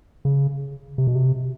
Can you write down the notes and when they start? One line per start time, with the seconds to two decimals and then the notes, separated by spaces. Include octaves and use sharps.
0.25 C#3
0.98 C3
1.07 B2
1.15 C3